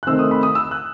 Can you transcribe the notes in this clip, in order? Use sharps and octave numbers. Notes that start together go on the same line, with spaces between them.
F#6
C3 D#3 A3 C4 E6
D#6
B5
D#6
E6
F#6